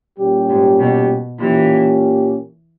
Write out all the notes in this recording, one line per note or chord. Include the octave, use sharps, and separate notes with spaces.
A#2 G3 C#4 G4
G#2
B2
A#2 E3 A#3 C#4 G4